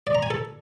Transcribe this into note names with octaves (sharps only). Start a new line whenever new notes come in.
D5
A#5
G#5
A4